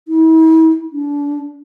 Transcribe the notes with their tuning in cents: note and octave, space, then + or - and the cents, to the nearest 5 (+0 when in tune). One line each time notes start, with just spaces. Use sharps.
E4 -40
D4 -30